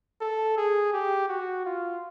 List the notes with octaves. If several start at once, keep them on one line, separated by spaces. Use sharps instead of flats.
A4
G#4
G4
F#4
F4